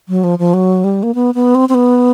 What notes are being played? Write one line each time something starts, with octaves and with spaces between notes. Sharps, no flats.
F#3
F3
F3
F#3
G3
A#3
B3
B3
C4
C4
B3